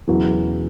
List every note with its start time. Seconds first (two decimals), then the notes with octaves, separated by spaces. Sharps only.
0.08 E1 E2 C#3 E3 F#3